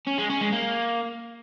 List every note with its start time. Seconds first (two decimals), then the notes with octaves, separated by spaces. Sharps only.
0.07 C#4
0.18 G#3
0.30 C#4
0.41 G#3
0.52 A#3